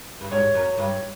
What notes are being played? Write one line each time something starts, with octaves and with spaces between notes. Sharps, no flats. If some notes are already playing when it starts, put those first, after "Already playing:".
G2
G#2 C#5
F#2
G2